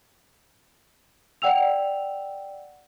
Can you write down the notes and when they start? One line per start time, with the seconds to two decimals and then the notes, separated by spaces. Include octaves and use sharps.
1.42 D5 F#5 G5 E6 F7